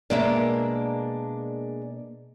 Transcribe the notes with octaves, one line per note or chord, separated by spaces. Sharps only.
B2 G#3 A#3 D4 E5